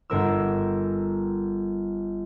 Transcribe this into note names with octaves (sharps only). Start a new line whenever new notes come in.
G1 A#4 E6